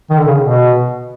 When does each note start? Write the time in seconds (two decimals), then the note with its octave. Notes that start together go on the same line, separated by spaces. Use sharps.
0.10 D#3
0.18 D3
0.27 C#3
0.43 B2